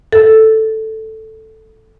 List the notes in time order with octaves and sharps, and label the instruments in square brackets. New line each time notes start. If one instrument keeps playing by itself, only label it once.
[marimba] A4